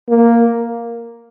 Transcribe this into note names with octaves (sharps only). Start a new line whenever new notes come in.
A#3